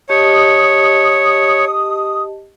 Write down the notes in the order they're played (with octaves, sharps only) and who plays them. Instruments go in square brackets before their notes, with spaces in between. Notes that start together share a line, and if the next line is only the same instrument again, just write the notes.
[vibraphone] G4 D#5 A5 [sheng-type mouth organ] C#5 [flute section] D#6